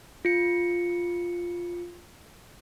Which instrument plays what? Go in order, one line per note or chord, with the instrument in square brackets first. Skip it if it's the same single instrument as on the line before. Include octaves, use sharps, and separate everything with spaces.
[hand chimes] F4 C#7